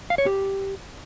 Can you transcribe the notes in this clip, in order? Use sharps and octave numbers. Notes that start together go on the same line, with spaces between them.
F5
C#5
G4